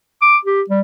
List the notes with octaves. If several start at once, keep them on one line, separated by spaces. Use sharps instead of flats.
D6
G4
G3